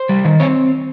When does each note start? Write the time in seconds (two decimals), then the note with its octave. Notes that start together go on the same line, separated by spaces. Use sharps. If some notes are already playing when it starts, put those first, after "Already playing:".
Already playing: C5
0.09 G3
0.25 D#3
0.40 C4 C#5